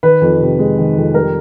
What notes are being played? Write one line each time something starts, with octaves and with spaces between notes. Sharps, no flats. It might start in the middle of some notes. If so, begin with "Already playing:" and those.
D#3 B4
F2
C3
G#3
D#3
F2
G3 A#4